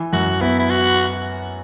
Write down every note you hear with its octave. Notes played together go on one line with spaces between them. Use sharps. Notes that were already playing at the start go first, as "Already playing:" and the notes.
Already playing: E3
F#2 F#4
B3 E4
E4
F#4